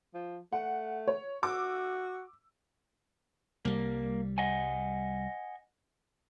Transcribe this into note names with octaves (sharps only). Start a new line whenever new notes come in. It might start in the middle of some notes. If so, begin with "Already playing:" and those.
F3
A3 F#5
C#5
F#4 D6 E6
C2 G3 A#3
D#5 F#5 G#5